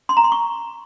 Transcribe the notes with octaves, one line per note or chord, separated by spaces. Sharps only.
C6
A#5
C6
C#6